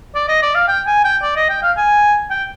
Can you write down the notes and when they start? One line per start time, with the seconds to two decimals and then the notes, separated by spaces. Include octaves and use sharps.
0.15 D5
0.28 D#5
0.42 D5
0.55 F5
0.68 G5
0.87 G#5
1.04 G5
1.22 D5
1.36 D#5
1.50 G5
1.63 F5
1.77 G#5
2.30 G5